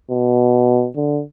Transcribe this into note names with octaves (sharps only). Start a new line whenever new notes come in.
B2
D3